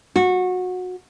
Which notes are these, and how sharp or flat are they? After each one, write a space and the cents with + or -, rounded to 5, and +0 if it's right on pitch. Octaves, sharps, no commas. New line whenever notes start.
F#4 -20